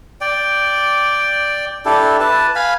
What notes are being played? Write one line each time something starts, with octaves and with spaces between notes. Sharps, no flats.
D5 G5
D4 E4 G4 A4
B4 A5
F5 G#5 B5